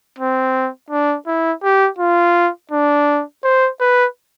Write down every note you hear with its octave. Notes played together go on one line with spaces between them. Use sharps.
C4
D4
E4
G4
F4
D4
C5
B4